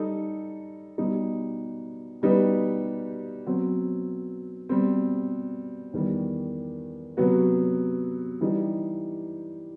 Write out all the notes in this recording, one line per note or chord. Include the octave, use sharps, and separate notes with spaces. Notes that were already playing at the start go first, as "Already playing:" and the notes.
Already playing: G3 D#4 A4
B2 G3 D#4
B2 G3 D#4 G4 B4
B2 F#3 C4
B2 G3 C4
E2 D#3 G3
C3 F#3 B3 F#4
E3 G3 D#4 G4